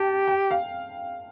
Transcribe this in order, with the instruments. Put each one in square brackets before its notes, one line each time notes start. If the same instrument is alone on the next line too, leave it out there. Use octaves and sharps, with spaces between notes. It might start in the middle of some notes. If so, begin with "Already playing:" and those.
Already playing: [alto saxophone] G4 [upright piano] G5 A5
[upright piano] G5
F5